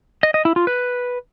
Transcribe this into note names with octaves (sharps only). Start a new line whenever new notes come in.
D#5
D#5
E4
F4
B4